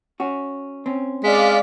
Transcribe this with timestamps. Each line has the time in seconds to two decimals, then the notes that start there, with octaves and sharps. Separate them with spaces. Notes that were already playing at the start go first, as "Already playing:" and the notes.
0.20 C#4 F#4
0.86 C4 C#4
1.24 G#3 D5 F5 B6